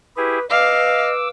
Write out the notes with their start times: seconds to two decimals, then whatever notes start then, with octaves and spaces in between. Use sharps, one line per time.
0.17 E4 G4 G#4 B4
0.50 B4 D#5 F5 D6 E6